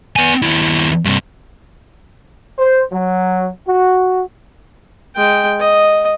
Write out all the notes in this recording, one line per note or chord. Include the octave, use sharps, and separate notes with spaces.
B3 G#5
D#2 E4
G2 C3
C5
F#3
F#4
G#3 G5
D#5